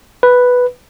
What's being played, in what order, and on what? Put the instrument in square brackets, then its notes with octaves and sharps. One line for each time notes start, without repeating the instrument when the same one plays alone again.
[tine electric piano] B4